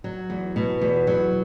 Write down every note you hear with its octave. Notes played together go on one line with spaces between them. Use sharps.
F#3
E2
B2
E2
F#3